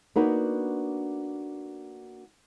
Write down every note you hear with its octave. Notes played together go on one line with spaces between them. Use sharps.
A#3 B3 D4 D#4 F#4 B4